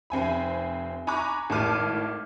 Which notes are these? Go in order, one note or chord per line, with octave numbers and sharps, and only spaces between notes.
F1 C4 G#5 B5
G#5 A#5 B5 C#6 D6 F#6
G#1 A2 A5 D6 F6 D#7